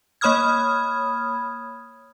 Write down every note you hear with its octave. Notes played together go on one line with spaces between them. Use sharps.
A#3 C#5 B5 D#6 F6 G#6